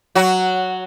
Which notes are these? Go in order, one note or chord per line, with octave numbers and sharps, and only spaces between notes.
F#3 F#4